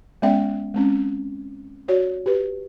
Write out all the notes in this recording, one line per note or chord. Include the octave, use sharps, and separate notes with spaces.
G#3 B3 C#4 D5 E5 G5
G#3 C4 C#4
F#4 C#5 D5
G4 B4